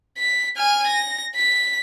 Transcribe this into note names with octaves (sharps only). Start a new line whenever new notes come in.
B6
G#5 F6
A#6
B6